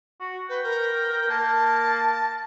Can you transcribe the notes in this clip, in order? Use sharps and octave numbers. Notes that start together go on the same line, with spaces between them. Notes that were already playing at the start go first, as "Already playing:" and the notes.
F#4
B4 G5
A#4
A#3 A5